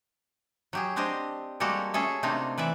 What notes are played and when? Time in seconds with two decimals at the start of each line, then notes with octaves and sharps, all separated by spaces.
0.73 F#3 G4 G#4
0.96 C4 D4 G4 C5 D#5
1.60 G3 G#3 A#3 F#4 G4 A4
1.94 C#4 G#4 A4 E5
2.23 C3 A3 A#3 C4 D4 D#4
2.58 E3 B4 D5 E5